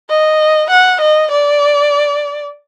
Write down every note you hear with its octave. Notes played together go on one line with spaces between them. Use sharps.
D#5
F#5
D#5
D5